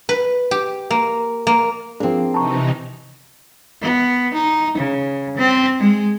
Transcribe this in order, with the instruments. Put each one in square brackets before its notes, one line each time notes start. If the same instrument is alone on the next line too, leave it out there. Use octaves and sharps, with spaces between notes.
[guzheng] B4
G4
A#3
A#3
[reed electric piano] F3 D4 [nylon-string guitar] A#3 C4 [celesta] G#4
[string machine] C3 E3 D#4 [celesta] A5 A#5 C#6
[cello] B3
D#4
C#3
C4
G#3